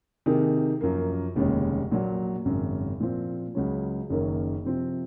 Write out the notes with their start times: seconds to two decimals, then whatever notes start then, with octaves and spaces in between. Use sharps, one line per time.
0.26 C3 D#3 A#3 D#4 G#4
0.81 F#2 F3 A#3
1.35 F1 D#2 C#3 G#3 C#4
1.91 A#1 A#2 F#3
2.45 G#1 F#2 C#3
3.00 A#2 F3 C4 F4
3.55 C#2 C#3 F#3 C#4
4.10 F#1 F#2 D#3 A#3 C#4
4.65 C3 F3 C4